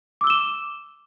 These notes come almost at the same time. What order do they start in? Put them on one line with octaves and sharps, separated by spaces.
D6 E6 G7 E7